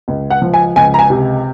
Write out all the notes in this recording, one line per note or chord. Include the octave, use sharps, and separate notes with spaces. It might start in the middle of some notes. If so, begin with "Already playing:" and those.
C#2
F#5
F3
G#5
C#2 G#5
A#5
G#5
C3